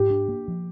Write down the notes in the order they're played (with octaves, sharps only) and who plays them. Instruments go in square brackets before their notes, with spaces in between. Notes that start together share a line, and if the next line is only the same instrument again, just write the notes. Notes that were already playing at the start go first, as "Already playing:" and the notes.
Already playing: [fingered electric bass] G#2 [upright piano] G4
[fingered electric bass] D4
A#3
F3